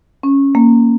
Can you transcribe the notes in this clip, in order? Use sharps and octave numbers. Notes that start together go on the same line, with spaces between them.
C#4
A#3